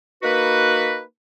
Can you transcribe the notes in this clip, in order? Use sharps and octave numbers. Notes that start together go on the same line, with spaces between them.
A#3 D#4 F#4 B4